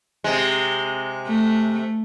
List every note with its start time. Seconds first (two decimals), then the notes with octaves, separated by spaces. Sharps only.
0.24 C3 G#3
1.27 A3